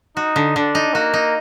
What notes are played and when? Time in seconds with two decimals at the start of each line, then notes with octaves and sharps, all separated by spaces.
0.16 D#4 F#4
0.36 D3
0.56 D3 D4
0.75 D#4
0.94 A#3 F#4
1.14 D#4